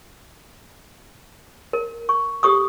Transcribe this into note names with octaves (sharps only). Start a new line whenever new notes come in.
A#4
C#6
G4 A4 C#6 D#6